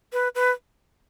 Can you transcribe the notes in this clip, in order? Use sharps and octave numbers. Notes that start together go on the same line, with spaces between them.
B4
B4